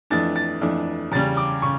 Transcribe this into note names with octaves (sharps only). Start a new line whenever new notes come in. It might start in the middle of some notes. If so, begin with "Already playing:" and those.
F2 E3 A3 D4 A6
A6
F2 E3 A3 D4
E2 C#3 G3 A6
D6
C#3 C#6